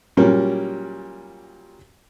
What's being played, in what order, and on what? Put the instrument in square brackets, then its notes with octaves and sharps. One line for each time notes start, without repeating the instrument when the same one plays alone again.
[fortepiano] A#2 F#3 G3 C#4 A#4